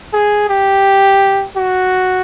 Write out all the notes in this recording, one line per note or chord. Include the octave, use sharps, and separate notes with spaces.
G#4
G4
F#4